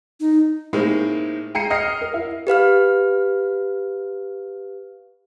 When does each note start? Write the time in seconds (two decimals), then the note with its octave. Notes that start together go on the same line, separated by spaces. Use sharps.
0.20 D#4
0.73 A2 G#3 A#3 C4 D#4
1.54 G#3 G5 A#5 C7 C#7 D#7
1.70 D#5 F6 C7
2.01 A#4
2.14 E4
2.47 G4 B4 F5 F6